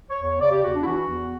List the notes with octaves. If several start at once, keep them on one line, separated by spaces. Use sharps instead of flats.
C#5
E2
C#5
C#3 D5
G4
E2 F#4
D4
E4
E3 F#4
E2